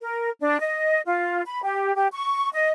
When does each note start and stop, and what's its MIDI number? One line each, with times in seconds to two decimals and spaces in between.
0.01 0.30 70
0.40 0.60 62
0.60 1.01 75
1.06 1.43 65
1.47 1.61 83
1.63 1.94 67
1.96 2.08 67
2.12 2.49 85
2.54 2.71 75